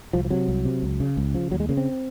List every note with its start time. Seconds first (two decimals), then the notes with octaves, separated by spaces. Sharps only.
0.13 C2 F3
0.25 F3
0.30 C3 F#3
0.48 C2
0.65 C3
0.83 C#2
1.00 C#3
1.17 C#2
1.34 C#3 F3
1.51 D#2 F#3
1.60 G#3
1.69 C#3 A#3
1.77 C4